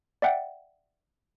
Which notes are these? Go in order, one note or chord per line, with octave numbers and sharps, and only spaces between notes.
D5 E5 F#5 G5